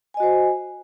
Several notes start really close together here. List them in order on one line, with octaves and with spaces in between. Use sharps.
G#5 D#5 F#4 C5